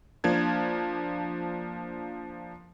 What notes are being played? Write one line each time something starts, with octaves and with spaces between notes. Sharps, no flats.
F3 A#3 D4 G#6